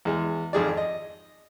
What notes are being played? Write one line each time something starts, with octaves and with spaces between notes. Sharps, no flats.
E2 G#3
G#1 F2 G#4 D5
D#5